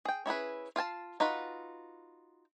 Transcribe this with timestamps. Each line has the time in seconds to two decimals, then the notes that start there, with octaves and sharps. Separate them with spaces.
0.05 G#4 G5
0.26 C#4 E4 G#4 B4
0.76 F4 F5 G#5 A5
1.20 D#4 F4 F#4 B4